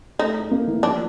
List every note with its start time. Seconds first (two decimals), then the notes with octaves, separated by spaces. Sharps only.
0.19 A3 D#4
0.40 A3
0.51 A#3
0.67 E3
0.83 F3 D4